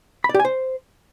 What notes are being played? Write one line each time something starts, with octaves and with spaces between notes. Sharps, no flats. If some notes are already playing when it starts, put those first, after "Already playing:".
B5
D5
G4
G#5
C5